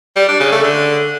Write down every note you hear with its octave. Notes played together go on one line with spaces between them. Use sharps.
G3
D4
C#3
A3
D3